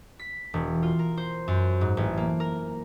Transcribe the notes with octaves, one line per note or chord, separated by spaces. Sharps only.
B6
E1
F4
A#4
C5
F#2
G#2
A1
A#3
A#4